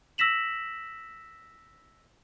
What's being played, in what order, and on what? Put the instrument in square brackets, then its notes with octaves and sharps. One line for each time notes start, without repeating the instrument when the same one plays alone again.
[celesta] E6 A#6 B6 E7 F#7